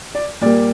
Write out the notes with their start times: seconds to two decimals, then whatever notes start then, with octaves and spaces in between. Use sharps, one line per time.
0.15 D5
0.41 A#2 G3 A#3 D5